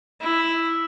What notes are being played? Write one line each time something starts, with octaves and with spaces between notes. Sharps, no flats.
E4